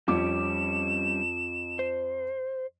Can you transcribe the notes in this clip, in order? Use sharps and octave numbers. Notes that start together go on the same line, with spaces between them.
F2 G3 C#4 D6 E7
C5